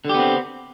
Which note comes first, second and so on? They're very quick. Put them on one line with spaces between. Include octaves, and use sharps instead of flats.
D3 G4 B3 C4